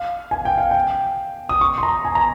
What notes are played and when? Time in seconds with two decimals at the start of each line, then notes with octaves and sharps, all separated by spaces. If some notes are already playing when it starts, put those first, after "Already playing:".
Already playing: F5
0.31 G#5
0.45 G5
0.58 F5
0.71 G5
1.49 D#6
1.61 C#6
1.78 C6
1.83 A#5
2.05 G#5
2.15 A#5